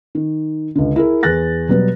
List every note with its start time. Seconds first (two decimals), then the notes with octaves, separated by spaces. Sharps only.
0.15 D#3
0.75 C#2 D3
0.96 E4 G#4 A#4
1.23 E2 G#4 F#6 A6 A#6
1.68 B2 F#3 G3 B3